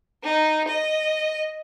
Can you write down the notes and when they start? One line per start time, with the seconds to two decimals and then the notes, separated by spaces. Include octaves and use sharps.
0.24 D#4
0.68 D#5